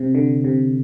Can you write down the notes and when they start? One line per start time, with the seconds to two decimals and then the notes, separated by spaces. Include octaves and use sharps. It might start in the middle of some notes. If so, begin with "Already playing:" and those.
Already playing: C3
0.15 D3
0.44 C3